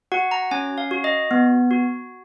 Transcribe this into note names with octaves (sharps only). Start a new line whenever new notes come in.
F#4 F#5
A#5
C#4 G#5
F5
F#4
D#5
B3
F#4